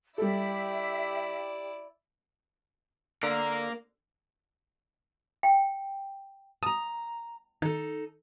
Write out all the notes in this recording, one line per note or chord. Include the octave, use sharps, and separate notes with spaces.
G3 E4 G4 A4 D5 E5
D3 A#3 A#4
G5
A5 A#5 D#6
D#3 D#4 A4